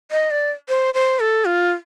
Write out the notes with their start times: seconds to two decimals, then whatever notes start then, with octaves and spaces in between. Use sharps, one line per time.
0.11 D#5
0.31 D5
0.69 C5
0.94 C5
1.20 A4
1.45 F4